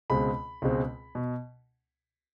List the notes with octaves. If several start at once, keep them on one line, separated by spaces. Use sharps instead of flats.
C#2 B2 G#3 C4 B5
C#2 B2 G#3 C4
B2